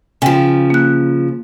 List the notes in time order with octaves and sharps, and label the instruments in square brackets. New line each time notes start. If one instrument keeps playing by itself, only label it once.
[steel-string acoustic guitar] C#3 F3 [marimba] G5 G#5
[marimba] A#3 F#6